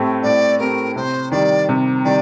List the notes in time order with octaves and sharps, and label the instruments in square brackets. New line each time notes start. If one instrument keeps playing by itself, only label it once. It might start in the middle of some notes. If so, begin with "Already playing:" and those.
Already playing: [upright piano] A2 A3 C4 G4
[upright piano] A2 [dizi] D5
[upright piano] A3 C4 G4 [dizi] A#4
[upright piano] C3 [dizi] C5
[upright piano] D#3 G3 [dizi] D5
[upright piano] C3
[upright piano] D#3 G3 [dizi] D5